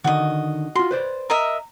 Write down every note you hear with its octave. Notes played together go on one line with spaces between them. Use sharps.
D3 D#3 F#4 D#5
F4 F#4 C6
B4 C5 D5
A#4 D#5 E5 A#5